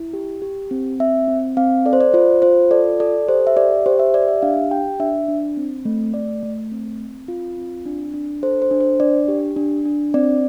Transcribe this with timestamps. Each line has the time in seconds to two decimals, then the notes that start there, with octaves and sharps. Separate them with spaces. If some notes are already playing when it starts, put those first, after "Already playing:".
Already playing: E4
0.13 G4
0.42 G4
0.71 C4
1.00 C4 E5
1.28 C4
1.57 C4 F5
1.86 A4 D5
1.93 C5
2.00 D5
2.14 F4 C5
2.42 F4 C5
2.71 A4 D5
3.00 A4 D5
3.28 G4 C5
3.47 E5
3.57 G4 D5
3.86 G4 C5
3.99 E5
4.14 G4 D5
4.28 E5
4.42 D4 F5
4.71 G4 G5
5.00 D4 E5
5.28 D4
5.57 C4
5.85 A3
6.14 A3 D5
6.43 A3
6.72 C4
7.00 C4
7.28 F4
7.57 C4
7.86 D4
8.14 D4
8.43 A4 C5
8.62 C5
8.71 D4
8.81 C5
9.00 D4 D5
9.28 G4
9.56 D4
9.85 D4
10.14 C4 D5